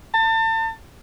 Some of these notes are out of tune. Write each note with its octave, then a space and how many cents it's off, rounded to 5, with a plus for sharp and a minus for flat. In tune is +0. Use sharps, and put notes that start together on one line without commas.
A5 +35